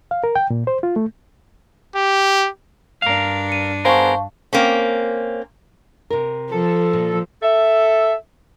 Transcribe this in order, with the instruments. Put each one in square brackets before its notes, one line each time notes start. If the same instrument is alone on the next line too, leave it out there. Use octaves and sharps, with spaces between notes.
[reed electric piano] F5
A#4
G5
A#2
C5
F4
A3
[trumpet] G4
[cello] G2 D4 [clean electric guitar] A#4 F5
[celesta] C#7 D#7
[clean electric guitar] B3 G#4 A#4 [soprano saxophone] C5 [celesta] F5 A5 C#6
[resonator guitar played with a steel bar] A#3 C4 C#4
[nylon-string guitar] C3 A#4
[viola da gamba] F3 [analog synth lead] A4
[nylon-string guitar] A#2
[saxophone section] A4 E5